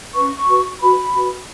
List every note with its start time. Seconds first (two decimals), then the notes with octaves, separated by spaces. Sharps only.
0.14 C#4 B4 C#6
0.48 F#4 B4
0.81 F#4 B4 B5
1.14 F#4 B4